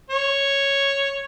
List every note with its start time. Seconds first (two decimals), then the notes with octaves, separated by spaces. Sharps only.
0.10 C#5